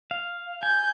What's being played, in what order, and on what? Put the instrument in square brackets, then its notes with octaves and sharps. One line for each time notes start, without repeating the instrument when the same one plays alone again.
[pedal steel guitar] F5
[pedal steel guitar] G#5 [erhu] G6